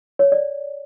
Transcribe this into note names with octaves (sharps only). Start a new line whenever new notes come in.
C#5
D5